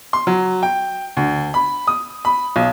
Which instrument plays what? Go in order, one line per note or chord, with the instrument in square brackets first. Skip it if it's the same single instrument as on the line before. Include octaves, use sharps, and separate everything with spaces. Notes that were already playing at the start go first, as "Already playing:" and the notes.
[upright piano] C6
F#3
G5
D2
B5
D#6
B5
B1